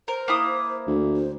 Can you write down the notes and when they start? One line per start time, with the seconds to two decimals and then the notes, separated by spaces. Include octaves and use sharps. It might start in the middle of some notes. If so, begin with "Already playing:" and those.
0.08 A#4 C5
0.28 A#3 E4 D#6
0.88 D2
1.16 C5